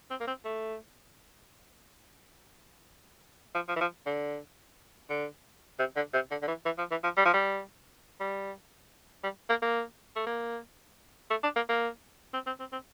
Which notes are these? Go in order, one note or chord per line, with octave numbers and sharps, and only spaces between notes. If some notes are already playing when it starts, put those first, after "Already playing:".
C4
A#3
C4
A3
F3
F3
E3
F3
D3
D3
C3
D3
C3
D3
D3
E3
E3
F3
E3
F3
G3
F3
G3
G3
G3
A#3
A#3
A3
A#3
A3
D4
A#3
A#3
C4
C4
C4
C4